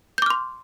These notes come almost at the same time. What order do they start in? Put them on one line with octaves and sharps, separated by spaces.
G6 D6 F6 C6